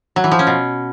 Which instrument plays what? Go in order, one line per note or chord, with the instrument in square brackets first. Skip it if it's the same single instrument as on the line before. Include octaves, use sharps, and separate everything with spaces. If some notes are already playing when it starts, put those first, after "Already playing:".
[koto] F#3
E3
F3
C#4
B2